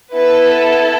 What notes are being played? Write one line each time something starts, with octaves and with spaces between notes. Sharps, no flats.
B3 E4 A4 B4